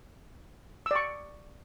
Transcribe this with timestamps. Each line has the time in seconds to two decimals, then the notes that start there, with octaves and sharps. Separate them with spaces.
0.86 E6
0.91 D5
0.96 C#6